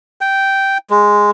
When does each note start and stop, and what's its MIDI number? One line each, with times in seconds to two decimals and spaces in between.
0.21 0.78 79
0.90 1.31 56